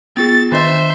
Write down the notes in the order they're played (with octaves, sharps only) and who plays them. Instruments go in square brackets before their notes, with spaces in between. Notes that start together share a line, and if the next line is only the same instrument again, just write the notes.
[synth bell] B3 F4 G#4 [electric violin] A6
[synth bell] D#3 D4 D#5 [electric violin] C5 E5